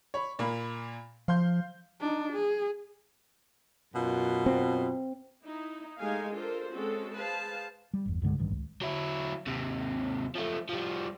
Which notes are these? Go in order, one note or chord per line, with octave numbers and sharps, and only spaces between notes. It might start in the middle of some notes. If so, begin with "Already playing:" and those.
C#5 B5
A#2 A#3 B5
F3 F5 C6 G6
D4 D#4
G#4
F#2 B2 F4
C4
D#4 E4
G#3 A3 D#4 G4 F5 G#5
D4 F4 A4 A#4 C5
G#3 C4 C#4 F#4 A4
G#4 B4 C5 F5 A5
G3
G1 E2
C2 G2 D3 G#3
A1 G2 D#3
C#2
F#3 E4
D#2 C3
F3 A3
F3 G3